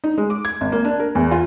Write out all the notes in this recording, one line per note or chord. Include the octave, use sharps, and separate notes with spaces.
D#4
G#3
D6
G#6
G#1
A#3
D4
A#4
E2
F4